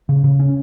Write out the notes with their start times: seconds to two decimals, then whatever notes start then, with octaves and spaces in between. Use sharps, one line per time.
0.09 C#3
0.24 C#3
0.39 C#4